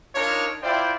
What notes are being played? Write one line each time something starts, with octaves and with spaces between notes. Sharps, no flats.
D4 D#4 F4 A#4 C#5
E4 F4 C5 D5 G5